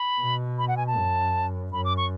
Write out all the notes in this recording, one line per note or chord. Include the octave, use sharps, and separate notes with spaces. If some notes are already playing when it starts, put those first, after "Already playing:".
Already playing: B5
B2
B5
F#5
G#5
A5
F#2
F#2 B5
D6
C#6